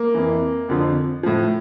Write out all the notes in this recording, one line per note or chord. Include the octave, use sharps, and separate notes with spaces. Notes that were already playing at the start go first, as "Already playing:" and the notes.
Already playing: A#3
F2 E3
F2 D3 F3
A2 F3